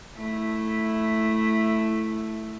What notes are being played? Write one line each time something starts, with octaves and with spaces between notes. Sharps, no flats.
A3 E4